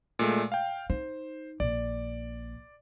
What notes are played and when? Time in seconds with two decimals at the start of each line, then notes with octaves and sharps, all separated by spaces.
0.19 A#2 G#3 A3
0.52 F5 G5
0.90 D#4 C5
1.60 A#1 D5